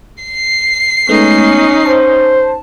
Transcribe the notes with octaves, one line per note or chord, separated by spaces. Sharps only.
C7
G#3 A3 B3 C#4 D#4
C5 A5